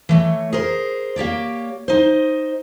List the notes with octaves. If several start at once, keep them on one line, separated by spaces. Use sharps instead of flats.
E3 A3 C#5
G#4 A#4 C5
A#3 G4 C#5 D5
D#4 C5